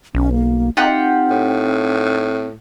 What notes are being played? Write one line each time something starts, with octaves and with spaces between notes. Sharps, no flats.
B1 C#4
A#3
C4 D#4 F4 G4 F#5
A2